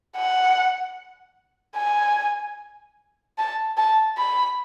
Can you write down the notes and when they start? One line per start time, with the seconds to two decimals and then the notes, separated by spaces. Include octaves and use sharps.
0.17 F#5
1.76 G#5
3.38 A5
3.77 A5
4.18 B5